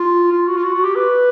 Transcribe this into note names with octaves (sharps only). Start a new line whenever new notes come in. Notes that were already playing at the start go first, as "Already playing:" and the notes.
Already playing: F4
F4
F#4
F4
F#4
F#4
G4
B4